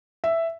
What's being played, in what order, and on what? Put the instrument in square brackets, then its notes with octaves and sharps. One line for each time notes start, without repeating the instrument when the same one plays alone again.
[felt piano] E5